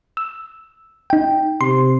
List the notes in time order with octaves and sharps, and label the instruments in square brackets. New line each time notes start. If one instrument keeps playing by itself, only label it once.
[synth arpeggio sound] E6
D#4 G5
[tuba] C3 [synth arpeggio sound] C6